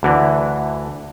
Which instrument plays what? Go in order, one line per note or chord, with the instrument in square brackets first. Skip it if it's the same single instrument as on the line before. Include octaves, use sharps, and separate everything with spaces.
[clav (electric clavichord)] D2 D3 E3